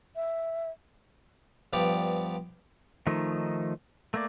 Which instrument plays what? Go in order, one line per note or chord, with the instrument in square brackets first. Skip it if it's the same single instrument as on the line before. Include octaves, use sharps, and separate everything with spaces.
[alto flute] E5
[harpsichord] G2 F3 B3 G4 D5
[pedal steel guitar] D#3 F3 A3 D#4
A3 A#3 D5